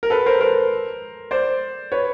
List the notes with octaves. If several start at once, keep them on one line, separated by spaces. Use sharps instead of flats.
A#4
A4 B4
A#4 C5
A#4 C5
C5 D5
B4 C#5